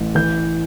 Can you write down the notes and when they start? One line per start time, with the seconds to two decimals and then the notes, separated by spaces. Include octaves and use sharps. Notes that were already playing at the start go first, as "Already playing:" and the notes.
Already playing: A1
0.15 E3 G6